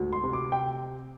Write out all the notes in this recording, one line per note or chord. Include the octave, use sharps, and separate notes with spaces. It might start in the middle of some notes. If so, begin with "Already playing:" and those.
Already playing: D2 G#2
C6
C3
D6
G5